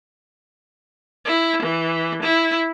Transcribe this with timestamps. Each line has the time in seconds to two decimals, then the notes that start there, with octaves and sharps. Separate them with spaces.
1.25 E4
1.63 E3
2.23 E4